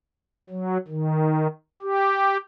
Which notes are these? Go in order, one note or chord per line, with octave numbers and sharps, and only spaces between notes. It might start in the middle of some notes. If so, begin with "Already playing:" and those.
F#3
D#3
G4